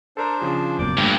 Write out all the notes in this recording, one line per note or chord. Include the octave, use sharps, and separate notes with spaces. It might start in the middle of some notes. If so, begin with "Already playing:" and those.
D4 A4 A#4 C5 A#5
C#3 F3 G#4
F#1 F#2 B2 A#3 D5 D6 G6
G1 G2 A3 A#3 A#6